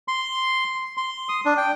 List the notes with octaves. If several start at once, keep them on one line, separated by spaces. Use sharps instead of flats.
C6
C6
D#6
D4
G5